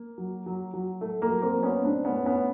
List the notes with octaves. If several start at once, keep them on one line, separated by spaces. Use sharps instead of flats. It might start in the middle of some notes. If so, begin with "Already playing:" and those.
Already playing: A#3
F#3
F#3
F#3
A2 A3
A#3
F#3
A#3 C4
F#3
B3 C#4
A2 C4 D4
B3 C#4
A2
B3 C#4